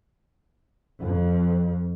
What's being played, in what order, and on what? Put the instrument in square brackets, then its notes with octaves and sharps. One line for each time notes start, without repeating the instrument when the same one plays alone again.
[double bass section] F2